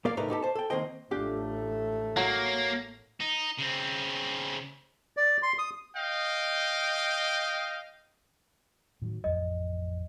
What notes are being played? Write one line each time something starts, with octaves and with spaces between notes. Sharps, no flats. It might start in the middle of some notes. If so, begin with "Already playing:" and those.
A#3 A#4 D5 F5
C2 G#2 A3 D#4 A#4 B4
B3 D#4 G4 A4
C5 A5
A4 G5
D#3 A#3 C4 C5 D#5 G5
A1 A3 D4 F4 G4
F#3 A#3
D#4
C#3 C4
D5
C6
D#6
D#5 F5 G5
A2 D#3 F#3
A1 F2 D#5